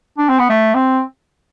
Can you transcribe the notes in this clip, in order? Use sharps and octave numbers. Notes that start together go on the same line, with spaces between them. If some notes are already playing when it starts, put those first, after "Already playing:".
D4
C4
B3
A3
C4